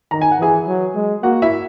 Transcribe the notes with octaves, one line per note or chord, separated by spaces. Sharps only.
D#3 A#5
G#5
F#5
E3 G#4 G#5
F#3
G#3
A#3 F#4 F#5
E4 E5